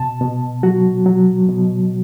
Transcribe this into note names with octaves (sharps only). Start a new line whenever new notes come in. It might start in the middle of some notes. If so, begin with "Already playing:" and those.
Already playing: B2 A5
B2
F#3 F#4
F#3
B2